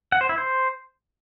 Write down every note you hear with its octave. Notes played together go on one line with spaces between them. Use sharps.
F#5
C5
E4
C5